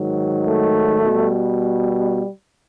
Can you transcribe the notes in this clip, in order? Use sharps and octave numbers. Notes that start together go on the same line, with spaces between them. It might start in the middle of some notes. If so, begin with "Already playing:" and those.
Already playing: G#2 D#3 F#3
A3
B2 G3